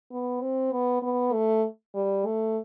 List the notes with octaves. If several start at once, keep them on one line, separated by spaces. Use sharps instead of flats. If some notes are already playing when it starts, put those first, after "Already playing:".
B3
C4
B3
B3
A3
G3
A3